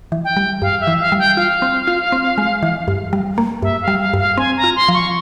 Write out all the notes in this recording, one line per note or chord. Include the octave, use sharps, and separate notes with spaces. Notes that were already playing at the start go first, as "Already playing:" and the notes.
E3
G5
G3
G2 F5
E5
E3
F5
G3
G5
F4 F5
C4
F4
C4
G#3
E3
G2
G3
A#3
G2 E5
F5
G3
F5
G2
F5
C4 G#5
A#5
F4
C6
F3
C#6